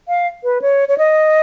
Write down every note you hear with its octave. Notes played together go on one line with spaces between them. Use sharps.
F5
B4
C#5
C#5
D#5